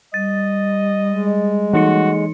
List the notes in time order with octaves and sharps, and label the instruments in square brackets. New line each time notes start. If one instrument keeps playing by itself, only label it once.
[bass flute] G3 [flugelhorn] D#5 [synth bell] A6
[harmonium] G#3
[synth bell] E3 D#4 C#7 [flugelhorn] F#4